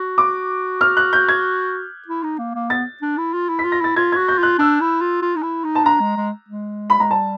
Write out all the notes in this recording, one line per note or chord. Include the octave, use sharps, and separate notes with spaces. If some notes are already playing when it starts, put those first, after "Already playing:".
Already playing: F#4
D6
F6
F#6
G6
G#6
E4
D#4
A#3
A#3
B3 A6
D4
E4
F4
E4
B6
F4
A#6
E4 A6
F4 G#6
G#6
F#4
G6
F4 F#6
D4 E6
E4
F4
F4
D#4
E4
D#4
A5
D4 A#5
G#3
G#3
G#3
B5
G#3 A#5
G3 A5